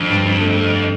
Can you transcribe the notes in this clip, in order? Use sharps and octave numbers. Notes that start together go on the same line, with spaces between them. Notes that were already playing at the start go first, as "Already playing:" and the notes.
Already playing: F2 D3
G2
G2
A3
A3